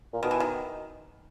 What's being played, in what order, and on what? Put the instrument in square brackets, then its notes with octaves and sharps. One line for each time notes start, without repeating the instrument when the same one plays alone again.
[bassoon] A#2
[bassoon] B2 [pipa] D#3
[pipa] E3
D#3